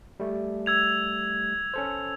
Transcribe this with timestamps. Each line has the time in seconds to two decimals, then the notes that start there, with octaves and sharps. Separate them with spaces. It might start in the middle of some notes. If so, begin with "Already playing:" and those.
0.20 G3 A3
0.66 E6 G#6 F7
1.74 C#4 A4 C5